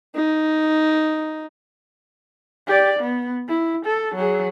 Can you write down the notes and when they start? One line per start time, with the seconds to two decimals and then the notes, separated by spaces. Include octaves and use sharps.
0.15 D#4
2.67 G4 D5
2.99 B3
3.48 E4
3.86 A4
4.15 F#3 G#4